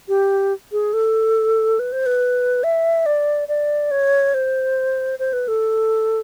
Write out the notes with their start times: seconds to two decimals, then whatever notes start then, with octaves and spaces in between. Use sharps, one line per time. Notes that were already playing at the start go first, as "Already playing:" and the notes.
0.08 G4
0.72 G#4
0.93 A4
1.79 B4
1.92 C5
2.06 B4
2.64 E5
3.06 D5
3.48 D5
3.91 C#5
4.34 C5
5.19 C5
5.33 B4
5.48 A4